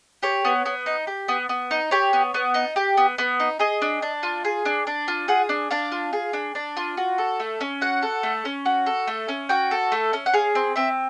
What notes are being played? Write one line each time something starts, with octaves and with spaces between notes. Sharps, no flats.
G4 C#5
B3
B3
D#4
G4
B3
B3
D#4
G4 C#5
B3
B3
D#4
G4
B3
B3
D#4
G#4 D#5
D4
D4
F4
G#4
D4
D4
F4
G#4 F#5
D4
D4 F5
F4
G#4
D4
D4
F4
F#4
A4
A3
C#4
F#4 F#5
A4
A3
C#4
F#4
A4
A3
C#4
F#4 G5
A4
A3
C#4
F#5
G#4 F5
C4
C4 E5